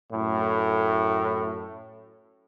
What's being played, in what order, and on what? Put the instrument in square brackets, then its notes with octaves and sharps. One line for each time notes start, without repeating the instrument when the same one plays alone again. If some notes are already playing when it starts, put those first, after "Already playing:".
[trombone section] F#2 A2